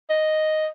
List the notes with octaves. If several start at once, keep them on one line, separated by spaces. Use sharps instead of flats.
D#5